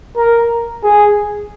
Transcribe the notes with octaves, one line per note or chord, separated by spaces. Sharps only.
A#4
G#4